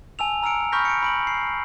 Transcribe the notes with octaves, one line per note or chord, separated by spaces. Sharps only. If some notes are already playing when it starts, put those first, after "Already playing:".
G#5 A5 E6 F7
A#5 E6 F6 C#7 D7
B5 C#6 F6 G6 A#6 B6
C#7 D7
B5 D7 F#7
C7